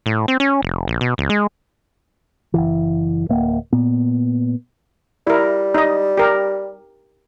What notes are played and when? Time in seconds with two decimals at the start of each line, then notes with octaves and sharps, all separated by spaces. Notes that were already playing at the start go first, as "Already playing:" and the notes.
0.06 A2
0.28 C4
0.40 C#4
0.62 F1
0.88 A#1
1.01 B2
1.18 C#2
1.30 G#3
2.54 F#1 C#2 E3
3.29 D1 A#3
3.73 A#2 B3
5.27 G3 E4 A#4
5.74 D#4 D#5
6.18 G4 A#4